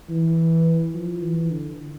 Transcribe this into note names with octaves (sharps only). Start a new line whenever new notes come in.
E3
F3
E3
D3